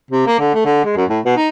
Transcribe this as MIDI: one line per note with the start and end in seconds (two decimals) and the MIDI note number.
0.11 0.25 48
0.26 0.38 58
0.39 0.49 50
0.54 0.62 57
0.65 0.83 50
0.85 0.94 56
0.96 1.04 42
1.09 1.20 45
1.25 1.32 47
1.37 1.49 63